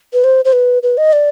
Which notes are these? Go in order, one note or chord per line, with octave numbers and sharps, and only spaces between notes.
B4
C5
C5
B4
B4
D#5
D5